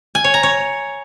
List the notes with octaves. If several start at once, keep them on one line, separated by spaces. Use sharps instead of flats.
G#5
C#5
A#5
C#5